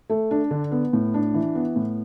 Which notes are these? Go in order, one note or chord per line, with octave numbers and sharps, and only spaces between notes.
A3
D4
D3
B3
A2
D4
E3
B3
A2